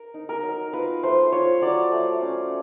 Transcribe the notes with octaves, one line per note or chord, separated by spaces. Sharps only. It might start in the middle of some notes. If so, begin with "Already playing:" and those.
Already playing: A#4
D#4
A#4
F#3
F4 B4
A3 C5
F4 C#5
F#3 D5
A3
C#4